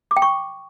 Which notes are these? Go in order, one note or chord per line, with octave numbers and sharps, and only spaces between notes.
D6
G5
C#6